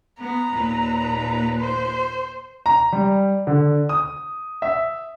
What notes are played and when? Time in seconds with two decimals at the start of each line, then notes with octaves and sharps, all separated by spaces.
0.22 B3 A#5
0.53 D#2 A#2 B4
1.60 C5
2.66 A#5
2.92 G3
3.47 D3
3.89 D#6
4.62 E5